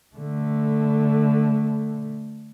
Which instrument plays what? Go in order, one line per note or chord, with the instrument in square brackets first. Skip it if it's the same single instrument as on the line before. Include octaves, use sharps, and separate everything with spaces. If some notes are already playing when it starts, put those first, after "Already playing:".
[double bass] D3 A3